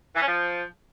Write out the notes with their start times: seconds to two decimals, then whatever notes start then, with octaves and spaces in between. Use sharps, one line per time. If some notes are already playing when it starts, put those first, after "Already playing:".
0.15 E3
0.21 C#4
0.27 F3